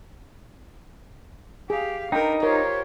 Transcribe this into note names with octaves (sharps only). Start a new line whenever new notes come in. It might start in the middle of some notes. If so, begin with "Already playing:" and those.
G4 G#4 F5
D4 D#4 A#4 B4 G5
F4 G4 A#4 C5 C#5